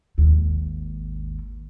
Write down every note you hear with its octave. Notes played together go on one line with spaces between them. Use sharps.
G#1 D#2